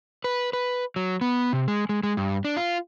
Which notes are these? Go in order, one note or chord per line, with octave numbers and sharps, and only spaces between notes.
B4
B4
F#3
B3
C3
G#3
G#3
G#3
G2
D4
F4